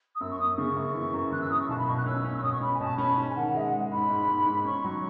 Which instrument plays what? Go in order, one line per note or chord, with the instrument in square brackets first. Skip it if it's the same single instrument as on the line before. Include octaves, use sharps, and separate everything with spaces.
[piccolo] D#6
[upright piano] F#2 [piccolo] E6
[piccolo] C#6
[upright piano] F#2 [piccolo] D#6
[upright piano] C#3 [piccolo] C#6
[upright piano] F#2
E3
F#2
[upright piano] E3 [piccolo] F#6
[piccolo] E6
[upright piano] F#2 [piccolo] D#6
[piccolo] C#6
[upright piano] B1 [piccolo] A5
[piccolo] B5
[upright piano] B2 [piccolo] C#6
[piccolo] F#6
[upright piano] C#4 [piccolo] E6
[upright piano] C#4
[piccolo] C#6
[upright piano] B2 [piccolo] D#6
[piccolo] C#6
[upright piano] C#4 [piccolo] B5
[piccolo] G#5
[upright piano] B2 [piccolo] A5
[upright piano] C#4 [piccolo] B5
[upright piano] G#2 [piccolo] A5
[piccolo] G#5
[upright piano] D#3 [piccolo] F#5
[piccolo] F#5
[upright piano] G#3 [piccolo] E5
[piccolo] F#5
[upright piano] G#3
[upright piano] G#2 [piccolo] B5
[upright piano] G#2
G#2
G#2
[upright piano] C#4 [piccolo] C#6
[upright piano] F#3